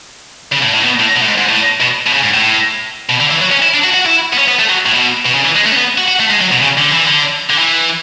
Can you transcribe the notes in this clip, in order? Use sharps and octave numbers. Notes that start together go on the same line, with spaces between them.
C#3
A2
A2
B2
A2
B2
A2
G#2
G#2
A2
B2
B2
C#3
G#2
A2
B2
D3
E3
F#3
C#4
E4
D4
F#4
F#4
E4
B3
C#4
B3
A3
F#3
A2
B2
B2
C#3
E3
G#3
A3
C#4
B3
F#4
F#4
A3
G#3
F#3
B2
C#3
D3
E3
D3
D3
E3